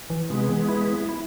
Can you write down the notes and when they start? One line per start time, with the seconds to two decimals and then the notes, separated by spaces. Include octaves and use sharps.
0.10 E3
0.30 C3 G#3 B3
0.49 E3
0.68 E4
1.09 E4